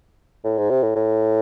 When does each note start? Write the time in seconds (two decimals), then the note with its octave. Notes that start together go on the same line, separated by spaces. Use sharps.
0.44 A2
0.58 G#2
0.70 C3
0.83 A2
0.96 A2